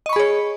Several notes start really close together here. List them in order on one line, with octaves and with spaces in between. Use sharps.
D#5 C#6 B5 G#4 C#5